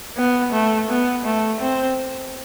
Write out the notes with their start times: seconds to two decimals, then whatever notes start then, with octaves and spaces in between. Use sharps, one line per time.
0.17 B3
0.53 A3
0.89 B3
1.25 A3
1.61 C4